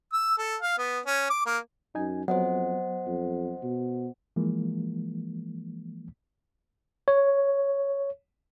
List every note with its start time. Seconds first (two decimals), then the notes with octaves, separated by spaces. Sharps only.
0.13 E6
0.38 A4
0.62 F5
0.78 B3
1.06 C#4
1.30 D6
1.46 A#3
1.95 F#2 D#4 G#5
2.28 F2 F#3 B3 C5 D#5 F#5
3.06 F2
3.62 B2
4.36 E3 F3 G#3 A#3
7.08 C#5